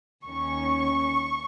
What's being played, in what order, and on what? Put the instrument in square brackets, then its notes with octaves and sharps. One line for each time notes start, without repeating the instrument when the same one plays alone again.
[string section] D#2 D#3 C#4 C#6